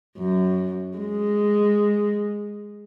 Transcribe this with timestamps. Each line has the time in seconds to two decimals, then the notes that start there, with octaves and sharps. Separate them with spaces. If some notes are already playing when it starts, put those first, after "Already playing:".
0.18 F#2
0.98 G#3